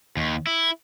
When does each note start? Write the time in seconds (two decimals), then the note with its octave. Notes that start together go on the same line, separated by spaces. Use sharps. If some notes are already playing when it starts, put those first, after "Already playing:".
0.17 D#2
0.47 E4